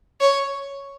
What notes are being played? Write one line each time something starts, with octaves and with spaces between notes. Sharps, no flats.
C#5